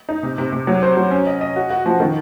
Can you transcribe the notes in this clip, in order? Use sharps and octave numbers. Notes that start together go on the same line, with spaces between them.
D#4
C3
C3
C3
F#3
C5
F#3
C#4
D#5
D#5
F#4
F#4
F3
D#3